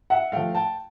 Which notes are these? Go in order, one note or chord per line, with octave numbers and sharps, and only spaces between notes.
E5 F#5
F3 A3 F5 G5
G5 A5